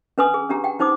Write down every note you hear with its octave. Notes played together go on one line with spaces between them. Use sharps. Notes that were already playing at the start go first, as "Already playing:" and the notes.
C#4 D4 B4 G#5 C6 D#6
G#4
C#4 D4 G4 A#5
F#5 G5
C#4 D#4 C5 D6 D#6